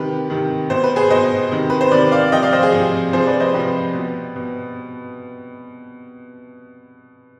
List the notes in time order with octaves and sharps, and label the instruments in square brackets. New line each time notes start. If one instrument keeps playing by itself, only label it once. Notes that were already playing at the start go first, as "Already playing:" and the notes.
Already playing: [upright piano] C3 D#3 G4 B4
C3 D#3
B2 C5
B4
G#4 C5
B2 C5 D#5
C3 D#3
B4
C5
C3 D#3 B4 D5
D5 F5
C3 F3 D#5 G5
D5 F5
C5 D#5
G#4
C3 F3
C3 F3 G#4 C5
B4 D5
C5 D#5
C3 F3 G4 B4
B2
B2